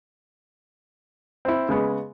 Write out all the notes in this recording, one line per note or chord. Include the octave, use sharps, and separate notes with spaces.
C4 E4
C#3 G#3 B3